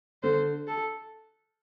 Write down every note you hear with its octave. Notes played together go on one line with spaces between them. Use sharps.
D3 C5
A4